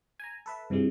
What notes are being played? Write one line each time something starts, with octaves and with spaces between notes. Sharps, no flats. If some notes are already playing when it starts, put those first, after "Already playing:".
G#5 A#5
A4 B4 E5
G2 C3 E3 F3 G#3